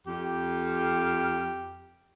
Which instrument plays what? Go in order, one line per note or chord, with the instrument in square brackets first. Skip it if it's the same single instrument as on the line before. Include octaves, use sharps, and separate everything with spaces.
[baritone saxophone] F2 [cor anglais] G4